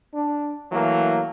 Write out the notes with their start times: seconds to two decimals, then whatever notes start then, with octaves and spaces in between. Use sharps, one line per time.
0.14 D4
0.72 E3 F#3 A3 A#3